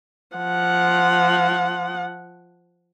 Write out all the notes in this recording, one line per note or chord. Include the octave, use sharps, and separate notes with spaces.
F3 F#5